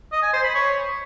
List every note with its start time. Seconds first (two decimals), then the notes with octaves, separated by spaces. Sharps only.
0.12 D#5
0.23 G#5
0.33 C5
0.44 B5
0.55 C#5